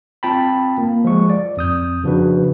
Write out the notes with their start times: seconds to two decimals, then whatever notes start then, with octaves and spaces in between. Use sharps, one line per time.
0.23 C4 F4 G5 A5 B5
0.78 A#3
1.04 F3 G#3 C#6
1.30 D5
1.57 F2 D#6 G6
2.04 C#3 F3 D4 F#4 B4